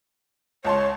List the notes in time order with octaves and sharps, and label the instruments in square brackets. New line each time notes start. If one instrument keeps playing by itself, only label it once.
[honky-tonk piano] C#2 A5 C6 [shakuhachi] C#5